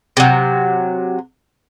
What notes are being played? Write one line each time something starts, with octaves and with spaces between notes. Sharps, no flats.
C3 F#3